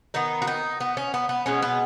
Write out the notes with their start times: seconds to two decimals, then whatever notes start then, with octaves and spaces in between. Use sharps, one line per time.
0.14 D#3 B3 D#4
0.42 F#4
0.47 D#4
0.80 B3
0.97 C#4
1.14 B3
1.29 B3
1.46 B2 G#3 B3 C#4
1.62 B3